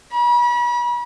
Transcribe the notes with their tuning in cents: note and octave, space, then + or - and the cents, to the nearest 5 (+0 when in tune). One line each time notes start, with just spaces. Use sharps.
B5 -40